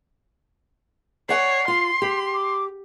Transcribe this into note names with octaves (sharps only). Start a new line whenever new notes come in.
C#5 D5 F#5 G#5 C7
F4 C6
G4
D6